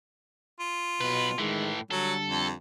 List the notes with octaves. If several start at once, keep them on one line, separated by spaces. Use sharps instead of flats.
F4
B1 B2 B4
A2 D#3 E3 G#3
D3 F#3 G3 A4
F2